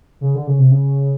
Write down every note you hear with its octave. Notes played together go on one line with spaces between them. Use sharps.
C#3
D3
C#3
C3
C#3